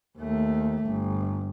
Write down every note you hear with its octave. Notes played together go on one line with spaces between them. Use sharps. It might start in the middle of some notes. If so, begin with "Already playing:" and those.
D#2 A3
G1